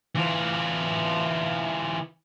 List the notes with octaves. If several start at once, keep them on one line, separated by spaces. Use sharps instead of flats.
E3 F4